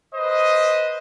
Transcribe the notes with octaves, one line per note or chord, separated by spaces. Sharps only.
B4 C5 D#5